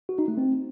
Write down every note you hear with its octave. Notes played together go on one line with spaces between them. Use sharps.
F#4
D#4
A3
C4